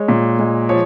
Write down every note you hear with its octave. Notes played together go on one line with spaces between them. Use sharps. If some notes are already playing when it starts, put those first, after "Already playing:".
Already playing: G#3 C#5
A#2
G#3
F3 C#5